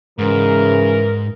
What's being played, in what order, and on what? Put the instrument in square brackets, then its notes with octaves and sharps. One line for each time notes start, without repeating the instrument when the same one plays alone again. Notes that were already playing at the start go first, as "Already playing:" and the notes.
[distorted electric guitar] G#2 [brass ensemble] C#3 E3 [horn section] A#4